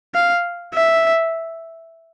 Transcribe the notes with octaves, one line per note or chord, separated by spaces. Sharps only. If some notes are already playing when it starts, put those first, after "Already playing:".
F5
E5